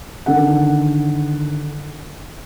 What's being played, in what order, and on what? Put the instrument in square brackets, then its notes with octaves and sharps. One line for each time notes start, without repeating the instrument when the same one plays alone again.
[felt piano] D3 D#3 A4 F#5